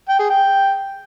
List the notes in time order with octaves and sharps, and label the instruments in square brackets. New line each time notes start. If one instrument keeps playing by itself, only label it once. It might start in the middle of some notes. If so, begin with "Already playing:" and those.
[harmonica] G5
G#4
G5